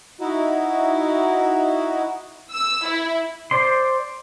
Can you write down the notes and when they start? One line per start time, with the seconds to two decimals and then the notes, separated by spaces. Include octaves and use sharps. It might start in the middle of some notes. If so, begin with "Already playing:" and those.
0.21 D#4 E4 F#4
2.52 E6
2.87 E4
3.51 C5 D5 C6